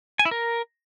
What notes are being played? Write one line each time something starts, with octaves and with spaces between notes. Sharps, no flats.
G#5
E4
A#4